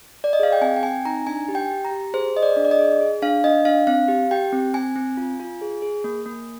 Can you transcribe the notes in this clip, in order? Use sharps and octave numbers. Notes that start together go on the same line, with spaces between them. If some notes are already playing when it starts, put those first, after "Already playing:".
D5
D#5
G#4 F5
G5
C4 G#5
G5
C4 G#5
D#4 A#5
D4 G#5
G4
G5
G4
A#5
G4
G#4 C5
G#4 D#5
D5
D4
D5
D#5
G#4
G#4
D4 F5
D4 D#5
D4 F5
C4 F5
G4
G4 G5
C4
C4 G#5
C4
F4
F4
G#4
G#4
A#3
A#3